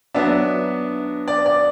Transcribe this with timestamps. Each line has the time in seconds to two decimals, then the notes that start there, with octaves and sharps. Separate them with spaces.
0.14 F#3 B3 D4 E5
1.28 D5
1.46 D5